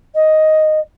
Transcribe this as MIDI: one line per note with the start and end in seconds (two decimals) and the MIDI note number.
0.14 0.79 75